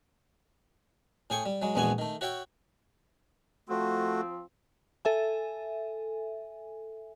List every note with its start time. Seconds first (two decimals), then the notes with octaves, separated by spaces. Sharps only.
1.30 A2 G#4 G5 G#5 C#6
1.45 G3
1.62 F#3 G#3
1.75 A#1 E2 G#3 B3 F#4 G#5
1.98 D#3 A3
2.21 F#4 C#5 E5 G5
3.69 F3 A3 C4 F#4
5.05 A4 E5 G#5